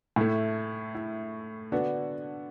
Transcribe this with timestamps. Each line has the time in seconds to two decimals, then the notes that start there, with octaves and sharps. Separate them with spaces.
0.16 A2 A3 E4
0.95 E4
1.72 D3 B3 D4 F#4